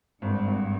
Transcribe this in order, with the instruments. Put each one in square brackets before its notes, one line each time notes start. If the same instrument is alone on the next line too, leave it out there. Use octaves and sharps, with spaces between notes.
[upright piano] G#1 [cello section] G2
[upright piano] G#1